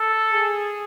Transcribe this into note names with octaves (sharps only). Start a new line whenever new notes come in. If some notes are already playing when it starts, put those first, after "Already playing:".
Already playing: A4
G#4